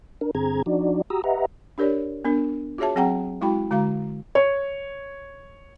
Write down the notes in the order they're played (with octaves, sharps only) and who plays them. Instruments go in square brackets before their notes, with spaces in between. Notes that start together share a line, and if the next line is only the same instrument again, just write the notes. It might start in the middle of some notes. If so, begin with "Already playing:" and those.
[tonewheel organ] D4 A#4
G2 D3 C4 G#4 A#5 G#6
F3 D4 D#4 F#4 D5
F#4 G4 A#5 D#6 E6
G4 B4 D#5 E5 F#5 A#5
[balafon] D4 G4 A#4 C#5 D5
B3 D4 A#4
F4 F#4 G#4 C#5 E5 A5
F#3 C4 G#4 F#5 G5 A#5
G#3 E4 F#4 G5 B5
D3 G#3 F#4 F5 A#5
[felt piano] C#5